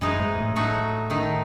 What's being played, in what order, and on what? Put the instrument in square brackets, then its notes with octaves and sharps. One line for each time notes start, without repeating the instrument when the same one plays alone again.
[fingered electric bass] F#2 [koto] E3 G#3 D#4
[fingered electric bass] G#2
A2
[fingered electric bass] A2 [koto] F#3 A3 D#4 F#4
[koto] D#3 A3 D#4